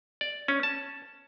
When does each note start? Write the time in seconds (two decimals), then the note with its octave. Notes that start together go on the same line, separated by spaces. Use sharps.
0.21 D5
0.48 C#4
0.63 A5